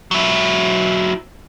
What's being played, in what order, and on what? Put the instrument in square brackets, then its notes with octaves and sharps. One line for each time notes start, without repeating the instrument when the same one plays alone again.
[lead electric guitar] F#3 E4